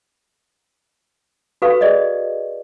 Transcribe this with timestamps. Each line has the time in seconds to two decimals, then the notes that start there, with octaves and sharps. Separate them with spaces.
1.62 F#4 A4 B4 F5 C#6
1.81 G#4 D5 D#5